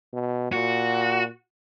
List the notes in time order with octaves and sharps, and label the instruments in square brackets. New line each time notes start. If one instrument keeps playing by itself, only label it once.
[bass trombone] B2
[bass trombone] A#2 [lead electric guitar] F#4